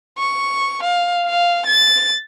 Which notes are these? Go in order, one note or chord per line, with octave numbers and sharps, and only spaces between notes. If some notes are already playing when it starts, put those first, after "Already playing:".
C#6
F5
F5
A6